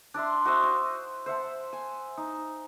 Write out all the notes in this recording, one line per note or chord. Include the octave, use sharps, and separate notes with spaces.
D4 D5 E5 C6
F#4 C5 D#5 E5
G5
C5 E5 F#5 A5
G#5
D#4